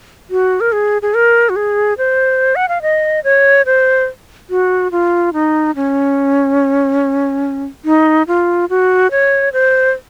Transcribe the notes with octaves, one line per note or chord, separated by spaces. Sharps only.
F#4
A#4
G#4
G#4
A#4
F#4
G#4
C5
F#5
F5
D#5
C#5
C5
F#4
F4
D#4
C#4
D#4
F4
F#4
C#5
C5